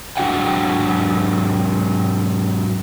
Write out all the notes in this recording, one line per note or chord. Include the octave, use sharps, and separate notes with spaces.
G#2 F#3 D4 F#4 F#5 G5